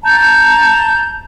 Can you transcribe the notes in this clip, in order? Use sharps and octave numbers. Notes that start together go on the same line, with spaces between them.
A5 A#5 G6